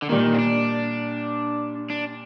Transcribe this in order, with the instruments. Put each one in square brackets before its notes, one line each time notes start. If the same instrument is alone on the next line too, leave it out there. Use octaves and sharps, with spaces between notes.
[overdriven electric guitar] D3
[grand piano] A#2 G3 A#3 [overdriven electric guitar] D#3
[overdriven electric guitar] C4
D4
D4